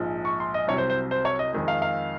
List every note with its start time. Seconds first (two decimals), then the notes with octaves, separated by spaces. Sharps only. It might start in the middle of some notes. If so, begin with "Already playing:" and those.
Already playing: A#1 G#2 F3 G#3
0.25 C#6
0.40 C6
0.54 D#5
0.67 C2 C3 F#3 C#5
0.78 C5
0.90 C5
1.11 C5
1.25 C#5
1.39 D#5
1.53 F2 D#3 G#3
1.68 F5
1.82 F5